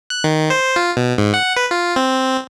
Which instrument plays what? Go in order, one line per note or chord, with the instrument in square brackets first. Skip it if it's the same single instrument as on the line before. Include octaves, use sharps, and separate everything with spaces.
[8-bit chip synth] F#6
D#3
C5
F4
B2
G#2
F#5
B4
F4
C4